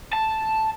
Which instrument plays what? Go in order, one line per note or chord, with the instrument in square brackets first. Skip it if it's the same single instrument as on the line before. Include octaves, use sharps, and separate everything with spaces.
[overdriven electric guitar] A5